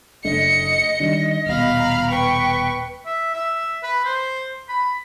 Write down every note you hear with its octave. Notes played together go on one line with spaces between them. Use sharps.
F#1 A3 D4 D#5 C#7
D#3 G3 D4
D#1 B2 F5 B5
A#5
B4 G5 C#6
E5
E5
B4
C5
B5